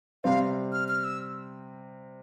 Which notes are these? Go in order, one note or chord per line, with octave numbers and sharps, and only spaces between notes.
C3 G3 C4 F5
F6
F6
E6